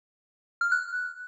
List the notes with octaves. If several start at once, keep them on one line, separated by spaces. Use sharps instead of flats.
F6
F#6